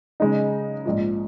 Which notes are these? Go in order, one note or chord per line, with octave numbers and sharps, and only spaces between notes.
C#3 G#3 D#4
A#1 G#2 F3